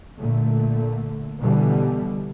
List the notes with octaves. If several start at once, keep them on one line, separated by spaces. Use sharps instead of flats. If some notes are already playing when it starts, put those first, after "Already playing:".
A#2 D3 A3
B2 D3 E3 G3